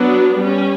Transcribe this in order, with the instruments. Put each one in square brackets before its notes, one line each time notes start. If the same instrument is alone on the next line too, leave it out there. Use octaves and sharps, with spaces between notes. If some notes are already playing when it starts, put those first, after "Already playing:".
Already playing: [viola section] F#3 B3 D4
G3 C#4